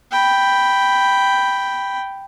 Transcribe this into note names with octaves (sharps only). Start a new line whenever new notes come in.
G5 B5